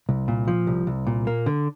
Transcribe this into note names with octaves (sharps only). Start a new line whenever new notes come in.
C2
A#2
F3
C2
C2
A#2
A#3
D3